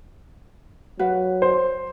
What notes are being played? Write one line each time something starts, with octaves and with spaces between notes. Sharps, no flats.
F#3 F#4 B4 F5
C5